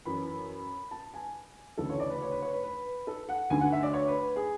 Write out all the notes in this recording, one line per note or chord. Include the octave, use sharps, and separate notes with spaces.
F#2 E3 B5
A5
G#5
D2 C#3 E3 A4
C#5
D5
B4
C#5
B4
C#5
B4
B4
A4
F#5
D2 D3 G#5
F#5
E5
D5
C#5
B4
G#4